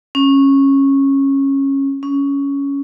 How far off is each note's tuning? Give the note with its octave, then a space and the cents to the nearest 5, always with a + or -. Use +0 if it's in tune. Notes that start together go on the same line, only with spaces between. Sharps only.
C#4 -15
C#4 +10